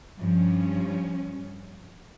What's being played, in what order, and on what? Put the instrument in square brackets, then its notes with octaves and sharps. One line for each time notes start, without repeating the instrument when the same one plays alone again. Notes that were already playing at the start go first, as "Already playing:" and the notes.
[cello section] G2 F3 C#4